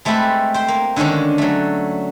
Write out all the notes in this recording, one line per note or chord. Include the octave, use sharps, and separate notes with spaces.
G#3 A3 C4 G4 A4 B4
C5 G5
A#3
D3 D#3 G#3 C#4 D4
F#3 A3